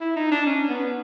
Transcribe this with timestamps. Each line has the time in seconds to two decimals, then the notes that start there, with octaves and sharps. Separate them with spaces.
0.01 E4
0.16 D#4
0.31 D4
0.46 C#4
0.69 B3